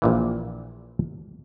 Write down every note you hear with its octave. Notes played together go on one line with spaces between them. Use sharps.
A#1 A#2 E3